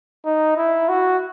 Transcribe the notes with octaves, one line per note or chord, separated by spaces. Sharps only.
D#4
E4
F#4